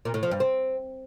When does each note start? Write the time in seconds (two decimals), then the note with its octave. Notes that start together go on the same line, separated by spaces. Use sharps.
0.05 A#2
0.14 A2
0.23 F3
0.31 G2
0.40 C4